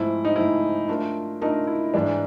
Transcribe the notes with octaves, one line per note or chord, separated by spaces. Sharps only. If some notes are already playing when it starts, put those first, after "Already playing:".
Already playing: G#2 F3 A3 C4 E4
D#4
G#2 F3 A3 C4 E4
A3 D4 F4 A#4
A3 D4 D#4 F4 A#4
E4
G#2 E3 G#3 D4